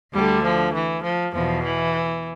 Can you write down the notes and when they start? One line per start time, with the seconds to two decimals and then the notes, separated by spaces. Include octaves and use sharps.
0.13 D2 D3 G3
0.43 F3
0.74 E3
1.04 F3
1.34 E2 B2 F3
1.63 E3